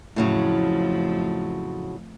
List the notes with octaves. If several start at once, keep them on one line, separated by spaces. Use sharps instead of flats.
F2 A2 C#3 F3 F#3 A3